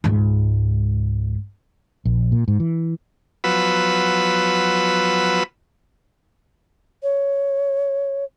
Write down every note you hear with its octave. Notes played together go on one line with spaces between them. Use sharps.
C#2 G#2
A#1
A#2
G#2
E3
F3 F#3 B3 B4 B5 E6
C#5